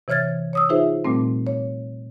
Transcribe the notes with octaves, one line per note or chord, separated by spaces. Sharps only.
C3 E3 C#5 F6 G#6 A6
C#5 D#6 E6
D#4 F4 G#4 B4 C5 E5
A#2 G3 A3 C4
C#5